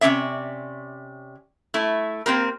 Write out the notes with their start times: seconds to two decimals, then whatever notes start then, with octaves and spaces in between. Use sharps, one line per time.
0.01 C3 C4 C#4 D5 E5
1.74 A3 E4
2.26 A#3 C4 G4 A#4